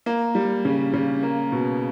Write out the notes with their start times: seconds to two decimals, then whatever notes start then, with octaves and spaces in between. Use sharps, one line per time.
0.06 A#3
0.35 G3
0.65 C#3
0.93 C#3
1.23 A#3
1.52 B2